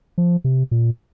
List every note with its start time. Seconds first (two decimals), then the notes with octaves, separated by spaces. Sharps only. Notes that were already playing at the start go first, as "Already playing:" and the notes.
0.18 F3
0.44 C3
0.71 A#2